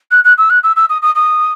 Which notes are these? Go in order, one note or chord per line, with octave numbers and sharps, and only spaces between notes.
F#6
F#6
E6
F#6
E6
E6
D#6
D#6
D#6